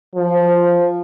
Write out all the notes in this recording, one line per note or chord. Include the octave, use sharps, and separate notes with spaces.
F3